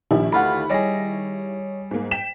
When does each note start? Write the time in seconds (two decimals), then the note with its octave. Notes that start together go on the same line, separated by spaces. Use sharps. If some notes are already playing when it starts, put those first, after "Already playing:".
0.11 A#1 D#3 E4 G4
0.32 D2 F4 F#5 B5
0.70 G3 G#4 C#5 D#5 A#6
1.91 G#2 A#3
2.11 G5 B6 E7